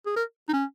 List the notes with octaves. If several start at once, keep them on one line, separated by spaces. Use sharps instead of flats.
G#4
A#4
D#4
C#4